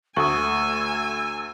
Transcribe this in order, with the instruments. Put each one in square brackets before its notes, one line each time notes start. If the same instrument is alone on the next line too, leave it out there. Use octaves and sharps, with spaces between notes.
[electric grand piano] D2 A3 D#6 [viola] G#5 [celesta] C#6 [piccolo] E6